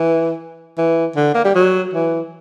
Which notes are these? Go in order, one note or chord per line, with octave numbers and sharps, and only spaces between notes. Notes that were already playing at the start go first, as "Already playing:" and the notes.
Already playing: E3
E3
D3
A#3
G3
F#3
E3